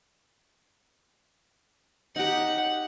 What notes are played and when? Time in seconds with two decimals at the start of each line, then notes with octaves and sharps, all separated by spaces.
2.16 D#4 G4 F#5